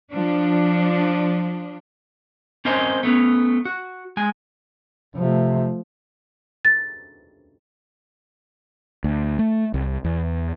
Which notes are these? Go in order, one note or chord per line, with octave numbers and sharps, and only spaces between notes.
F3 D4
C4 C#4 A#4 C5 D#5 G#5
A3 B3 C#4
F#4
G#3 G#5
C3 F3 A3
A6
D2
A3
C2
E2